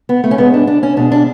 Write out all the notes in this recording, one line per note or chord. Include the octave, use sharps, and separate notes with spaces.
B3
A3
C#4
G#2 G#3 B3
D4
D4
C#4
B2 G#3 D4
D4